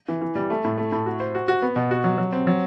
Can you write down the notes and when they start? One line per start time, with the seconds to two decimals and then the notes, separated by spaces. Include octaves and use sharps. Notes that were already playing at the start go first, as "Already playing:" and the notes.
0.09 E3
0.22 E3
0.35 G3
0.50 A3
0.64 A2
0.78 A3
0.92 A2
1.06 F#4
1.20 C5
1.35 F#4
1.48 F#4
1.62 B3
1.76 B2
1.91 F#4
2.04 F#3
2.18 F#3
2.32 C4
2.47 F#3